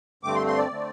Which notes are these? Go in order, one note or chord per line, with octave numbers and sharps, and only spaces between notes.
G2 D3 A3 C4 D6
C6
C6
D5
D3 A3 C4